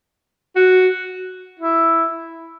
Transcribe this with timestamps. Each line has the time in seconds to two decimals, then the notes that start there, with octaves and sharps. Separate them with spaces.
0.56 F#4
1.59 E4